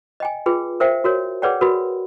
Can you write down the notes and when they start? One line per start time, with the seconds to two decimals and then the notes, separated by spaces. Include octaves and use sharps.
0.20 D#5 G5 G#5
0.46 F4 G#4 B4 G5
0.80 A#4 C5 E5 F5 G5
1.04 F#4 A#4 C#5
1.42 G#4 B4 C#5 D5 F#5 G5
1.61 F#4 A#4 B4 B5